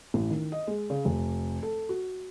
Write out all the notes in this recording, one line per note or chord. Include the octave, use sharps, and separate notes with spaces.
A1
D#3
D#5
G#3
C#3
F1
A4
F#4